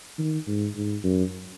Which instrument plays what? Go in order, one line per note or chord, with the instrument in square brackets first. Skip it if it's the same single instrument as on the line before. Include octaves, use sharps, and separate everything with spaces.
[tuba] D#3
G#2
G#2
F#2